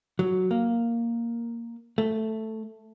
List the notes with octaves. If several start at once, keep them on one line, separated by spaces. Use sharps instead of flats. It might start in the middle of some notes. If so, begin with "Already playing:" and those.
F#3
A#3
A3